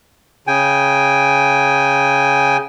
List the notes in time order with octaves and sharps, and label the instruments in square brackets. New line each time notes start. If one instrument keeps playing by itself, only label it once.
[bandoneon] C#3 G5 G#5